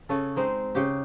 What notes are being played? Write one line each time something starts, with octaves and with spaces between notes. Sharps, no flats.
C#3 C#4 A4
G#3 C4 D#4
C#3 G4